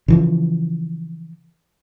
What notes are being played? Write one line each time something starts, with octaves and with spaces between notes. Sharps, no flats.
C#3 E3 F3